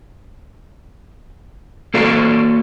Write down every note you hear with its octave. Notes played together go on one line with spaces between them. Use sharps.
A#3 F#4 A4 D5 F5